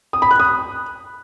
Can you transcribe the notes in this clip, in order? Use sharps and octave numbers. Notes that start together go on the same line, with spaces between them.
D#6
B5
F#6
D#6